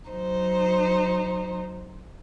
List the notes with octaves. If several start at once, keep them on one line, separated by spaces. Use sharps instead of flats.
F#3 D#4 C5